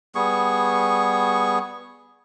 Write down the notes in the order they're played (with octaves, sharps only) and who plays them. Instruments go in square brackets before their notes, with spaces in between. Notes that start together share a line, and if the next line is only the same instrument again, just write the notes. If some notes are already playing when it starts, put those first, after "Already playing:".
[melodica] G3 B3 G#4 C#6